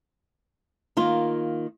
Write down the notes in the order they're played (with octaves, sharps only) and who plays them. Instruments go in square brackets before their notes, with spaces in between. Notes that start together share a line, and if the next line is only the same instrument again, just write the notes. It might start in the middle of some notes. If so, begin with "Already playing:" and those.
[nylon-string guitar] D#3 A#3 F4